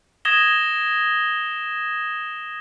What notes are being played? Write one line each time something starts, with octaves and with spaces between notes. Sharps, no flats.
D#6 G#6 A#6 E7 G7